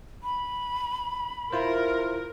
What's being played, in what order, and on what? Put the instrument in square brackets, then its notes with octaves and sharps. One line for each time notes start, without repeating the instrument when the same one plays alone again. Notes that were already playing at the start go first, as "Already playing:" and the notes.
[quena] B5
[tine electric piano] E4 F4 C5 [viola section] A#4